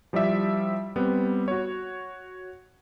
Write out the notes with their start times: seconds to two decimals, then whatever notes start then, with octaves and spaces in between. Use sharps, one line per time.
0.13 F3 G3 E4 D5 E5
0.96 G3 B3 C4
1.48 F#4 C#5